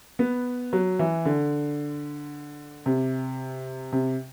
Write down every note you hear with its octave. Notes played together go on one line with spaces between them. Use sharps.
B3
F#3
E3
D3
C3
C3